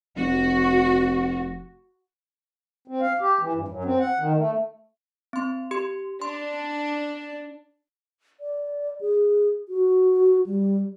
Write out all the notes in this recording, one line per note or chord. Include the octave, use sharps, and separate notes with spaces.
F1 F#4
C4
F5
G4
E3
G2
F#2
C4
F#5
D#3
A3
C4 C6
G4 C6
D4 C6
D5
G#4
F#4
G3